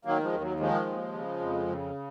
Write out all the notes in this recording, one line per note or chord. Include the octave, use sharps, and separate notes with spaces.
D#3 F#3 A#3
F3 G#3
D#2
F#3
D#3 F3 G#3
D#2
C#3
F2
C#3